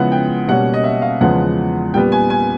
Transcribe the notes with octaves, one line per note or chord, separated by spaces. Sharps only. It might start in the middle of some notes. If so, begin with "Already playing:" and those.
Already playing: C#3 F3 G#3 B3 E4 F#5
G5
B2 G3 A#3 C#4 F#5
D#5
E5
F5
E2 C#3 F3 G#3 B3 F#5
A#2 G3 B3 G5
G#5
G#5